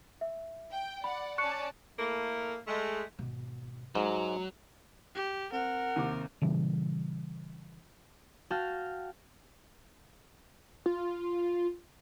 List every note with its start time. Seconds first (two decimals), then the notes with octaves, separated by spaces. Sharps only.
0.21 E5
0.71 G5
1.04 D5 F#5 B5
1.38 C#4 D5 A5 C#6 F#6 C#7
1.98 A2 A3 A#3
2.68 G#3 A3
3.19 G#1 B2
3.95 G#2 F#3 G#3
5.15 G4
5.52 C4 A#4 F#5
5.96 D#2 C3 D6
6.42 A#2 C#3 E3 G3
8.50 F#4 F5 G5 A5 F6
10.86 F4